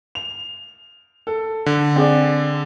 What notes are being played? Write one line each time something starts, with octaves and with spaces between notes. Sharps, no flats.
F7
A4
D3
C4 G#4 D5